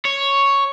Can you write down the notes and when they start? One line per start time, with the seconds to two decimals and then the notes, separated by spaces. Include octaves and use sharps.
0.05 C#5